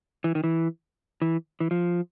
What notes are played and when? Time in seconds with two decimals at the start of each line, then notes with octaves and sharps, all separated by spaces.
0.24 E3
0.35 D#3
0.44 E3
1.22 E3
1.60 E3
1.71 F3